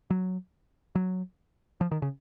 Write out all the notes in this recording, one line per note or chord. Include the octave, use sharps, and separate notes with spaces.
F#3
F#3
F3
D#3
C#3